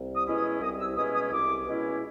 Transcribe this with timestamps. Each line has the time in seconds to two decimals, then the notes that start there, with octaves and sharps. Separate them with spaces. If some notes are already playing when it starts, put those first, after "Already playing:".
Already playing: C2
0.15 D#6
0.27 B2 G#3 C#4 E4
0.38 D#6
0.61 C2 D#6
0.79 E6
0.96 B2 G#3 C#4 E4 D#6
1.14 D#6
1.31 C2 D6
1.66 B2 G#3 C#4 E4